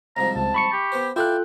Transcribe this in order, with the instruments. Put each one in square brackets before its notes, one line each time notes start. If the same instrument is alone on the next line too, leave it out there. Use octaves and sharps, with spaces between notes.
[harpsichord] C2 G#2 F3 [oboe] A#5
[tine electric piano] C#2 [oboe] A5
[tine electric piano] B5 C#6 C#7
[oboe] G4
[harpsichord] B3 B4 C5
[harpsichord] E4 D5 F5 [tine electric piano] F4 A4 F#6 [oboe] G5